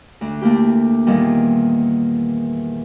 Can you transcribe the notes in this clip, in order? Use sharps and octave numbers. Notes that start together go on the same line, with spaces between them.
D2
A3 A#3 E4 G4
E2 A#2 D#3 G3